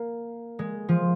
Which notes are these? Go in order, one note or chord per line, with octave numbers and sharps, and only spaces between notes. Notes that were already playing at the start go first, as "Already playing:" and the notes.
Already playing: A#3
G#3
F3